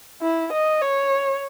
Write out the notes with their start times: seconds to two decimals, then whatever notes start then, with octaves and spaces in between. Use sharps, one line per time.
0.22 E4
0.53 D#5
0.82 C#5